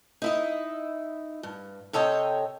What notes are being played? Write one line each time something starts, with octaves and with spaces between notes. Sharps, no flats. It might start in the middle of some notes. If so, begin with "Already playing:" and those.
D#4 E4 D#5
G2
C3 A4 C#5 D#5 G5